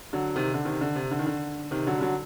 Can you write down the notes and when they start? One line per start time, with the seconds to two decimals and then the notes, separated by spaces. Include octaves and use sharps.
0.13 D3 F#3
0.36 C3 D#3
0.54 D3
0.65 C3 D#3
0.81 D3
0.95 C3
1.11 D3
1.19 D#3
1.27 D3
1.71 C3 D#3
1.87 D3 F#3
1.98 G3
2.01 D3 F#3